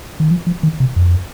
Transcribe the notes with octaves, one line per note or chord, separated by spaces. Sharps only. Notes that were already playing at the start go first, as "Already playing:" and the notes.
D#3
F3
F3
D#3
C3
F2